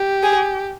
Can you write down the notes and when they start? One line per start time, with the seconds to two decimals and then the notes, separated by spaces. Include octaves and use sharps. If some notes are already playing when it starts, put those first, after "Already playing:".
Already playing: G4
0.23 G#4